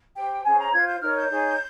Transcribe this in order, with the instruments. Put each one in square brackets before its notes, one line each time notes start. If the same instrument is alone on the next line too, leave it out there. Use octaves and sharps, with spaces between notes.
[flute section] G4 C5 G5
C#4 G#4 C5 G#5
A#5
F4 C5 G#6
G6
D#4 A#4 C#5 F6
G6
D#4 G#4 C#5